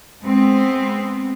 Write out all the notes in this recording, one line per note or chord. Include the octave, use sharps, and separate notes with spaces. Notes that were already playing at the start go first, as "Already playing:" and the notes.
G#3 B3 C4